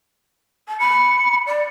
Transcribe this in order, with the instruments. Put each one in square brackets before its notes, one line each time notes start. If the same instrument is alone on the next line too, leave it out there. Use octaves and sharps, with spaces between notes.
[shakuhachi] A5
[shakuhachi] B5 [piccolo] C#7
[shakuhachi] D5